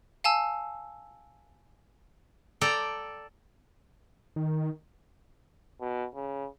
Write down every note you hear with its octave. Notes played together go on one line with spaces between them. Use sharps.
F5 G#5 A5 E6
A4 D5 G5 A#5
D#3
B2
C#3